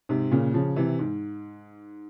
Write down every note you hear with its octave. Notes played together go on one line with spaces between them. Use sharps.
G#2 C3
A#2 C#3
C#3 F3
C3 E3
G#2